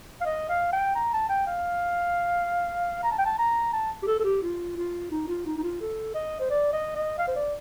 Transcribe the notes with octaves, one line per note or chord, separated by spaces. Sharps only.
F5
D#5
F5
G5
A#5
A5
G5
F5
A#5
A5
G5
A5
A#5
A5
G4
A4
A4
G4
F4
F4
D#4
F4
D#4
D#4
F4
A4
D#5
C5
D5
D#5
D#5
F5
C5
D5